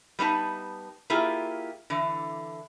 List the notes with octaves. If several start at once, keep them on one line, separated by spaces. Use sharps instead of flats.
G3 B3 D#4 A5
A#3 E4 F4 G4 G#4
D3 E3